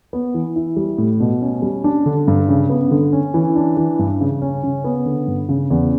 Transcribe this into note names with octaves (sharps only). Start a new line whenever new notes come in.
B3
E3
E4
G3
A2
B2
C#4
G3
D4
D3
G2
C#3
B3
D3
C#4
E3
D4
E3
G2
C#3
C#4
C#3
B3
D3
G2
C#3
E2